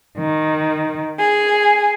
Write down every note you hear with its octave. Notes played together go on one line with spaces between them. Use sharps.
D#3
G#4